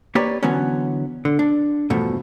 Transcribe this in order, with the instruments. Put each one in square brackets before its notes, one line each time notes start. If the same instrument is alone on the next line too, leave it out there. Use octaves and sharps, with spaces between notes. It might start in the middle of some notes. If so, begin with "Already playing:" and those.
[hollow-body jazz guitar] A#3 G4 B4 C#5 D5
D3 E3 F#3 B3 C#4
D3
D4
E2 G2 B2 F3 A3